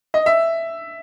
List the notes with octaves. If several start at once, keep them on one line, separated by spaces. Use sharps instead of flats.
D#5
E5